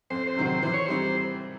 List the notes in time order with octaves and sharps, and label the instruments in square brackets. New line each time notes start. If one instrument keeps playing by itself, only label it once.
[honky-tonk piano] F2 [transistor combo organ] C5
[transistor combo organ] C5
[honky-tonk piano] C3 D#3 F#3
[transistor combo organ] C5
[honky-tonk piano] E3 [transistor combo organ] C5
[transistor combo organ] C#5
[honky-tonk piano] G3 C4 D#4 [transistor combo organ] C5